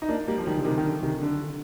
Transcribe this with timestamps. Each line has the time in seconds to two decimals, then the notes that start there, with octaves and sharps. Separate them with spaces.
0.02 D#4
0.09 A#3 D4
0.27 G3 A#3
0.38 F3
0.46 D#3 G3
0.57 D3
0.65 C3 D#3
0.78 D#3
0.85 D3
1.02 C3 D#3
1.22 D3